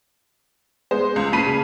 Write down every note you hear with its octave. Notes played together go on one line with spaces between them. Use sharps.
G#3 B3 C5
C#2
A#2 A5 B5 B6 C7 D#7
C#3